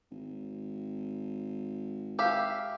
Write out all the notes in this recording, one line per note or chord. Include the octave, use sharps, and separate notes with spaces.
G#1
G4 E5 F5